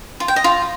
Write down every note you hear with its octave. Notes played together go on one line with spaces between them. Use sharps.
F4
G5
D#5
F4